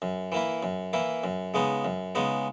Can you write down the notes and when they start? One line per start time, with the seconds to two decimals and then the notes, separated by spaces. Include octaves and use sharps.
0.02 F#2
0.32 E3 A#3 E4
0.63 F#2
0.93 E3 A#3 E4
1.24 F#2
1.54 C#3 G#3 B3 D#4
1.85 F#2
2.15 C#3 G#3 B3 D#4